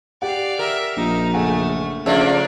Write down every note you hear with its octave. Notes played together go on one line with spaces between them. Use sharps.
G4 D5 F5 F#5
A#4 E5
A#1 D#4
F#1 A3 F#5 G#5
C#3 F3 A3 A#3 D4 E5